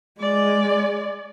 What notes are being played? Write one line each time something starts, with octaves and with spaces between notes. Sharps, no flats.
G#3 D5